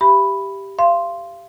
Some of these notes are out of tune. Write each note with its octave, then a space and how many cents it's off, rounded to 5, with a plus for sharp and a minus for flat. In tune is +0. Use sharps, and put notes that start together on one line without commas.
G4 +0 E5 +25 B5 +0
F5 -30 C6 +0